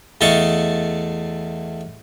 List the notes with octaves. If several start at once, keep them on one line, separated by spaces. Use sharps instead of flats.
E2 A3 D#5 F5 A5 C#6